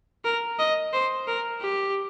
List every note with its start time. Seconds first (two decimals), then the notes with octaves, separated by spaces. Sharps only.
0.25 A#4
0.59 D#5
0.93 C5
1.27 A#4
1.61 G4